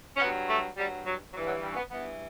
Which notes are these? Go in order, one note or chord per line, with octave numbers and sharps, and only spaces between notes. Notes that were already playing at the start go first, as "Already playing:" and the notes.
C#4
G2 F#3 B3
A3
G2 F#3 G3
F#3
G2 E3 F#3
F#3
G3
C#4
B3
G2 E3 B3